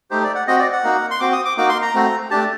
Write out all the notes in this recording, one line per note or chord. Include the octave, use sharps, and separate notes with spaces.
A3 D#4 G4 C5
D5
F#5
C4 F#4 D#5
D5
F#5
A#3 D#4 F#4
C6
C4 F#4 D6
D#6
D6
A#3 D#4 F#4 D6
C6
A#5
A3 C4 F#4
A3 D4 G4 A5